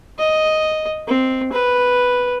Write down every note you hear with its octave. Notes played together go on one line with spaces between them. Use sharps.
D#5
C4
B4